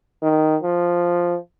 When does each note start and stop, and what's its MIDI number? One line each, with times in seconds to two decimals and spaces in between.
0.22 0.56 51
0.63 1.37 53